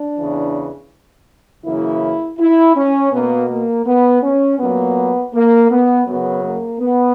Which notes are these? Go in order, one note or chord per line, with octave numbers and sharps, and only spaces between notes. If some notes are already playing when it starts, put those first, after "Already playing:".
Already playing: D4
E2 C#3 E3
F#2 C#3 E3 A#3 E4
E4
C#4
B2 A#3 B3
A#3
B3
C#4
A#2 F#3 A#3 B3
A#3
B3
F#2 C#3 F#3 B3
A#3
B3